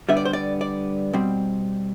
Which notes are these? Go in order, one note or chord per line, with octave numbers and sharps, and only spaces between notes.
D3 G3 B3 E5
D5
C5
D5
D5
B2 G3 C4